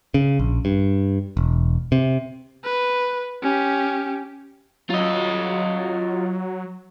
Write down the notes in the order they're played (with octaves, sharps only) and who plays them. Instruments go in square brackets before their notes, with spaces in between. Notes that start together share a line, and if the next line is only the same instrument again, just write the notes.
[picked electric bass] C#3
A#1
G2
E1
C3
[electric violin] B4
C#4 G4
[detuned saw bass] F#3 [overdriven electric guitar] F4 D#5